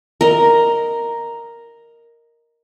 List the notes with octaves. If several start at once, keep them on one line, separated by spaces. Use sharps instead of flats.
A#4 D#5